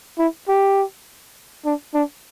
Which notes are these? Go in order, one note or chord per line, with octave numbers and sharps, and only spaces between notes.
E4
G4
D4
D4